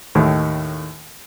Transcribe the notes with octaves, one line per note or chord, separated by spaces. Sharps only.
D#2 A2 D#3